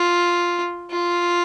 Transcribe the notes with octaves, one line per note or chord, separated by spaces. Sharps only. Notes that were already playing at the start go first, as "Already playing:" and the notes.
Already playing: F4
F4